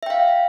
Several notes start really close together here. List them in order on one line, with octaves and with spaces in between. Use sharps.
E5 G5 F5